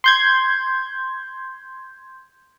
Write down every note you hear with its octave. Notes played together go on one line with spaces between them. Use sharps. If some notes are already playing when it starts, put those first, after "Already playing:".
C6 G6 G#6